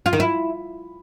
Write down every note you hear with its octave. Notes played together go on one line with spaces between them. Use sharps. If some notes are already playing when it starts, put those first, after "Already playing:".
F4
D#3
E4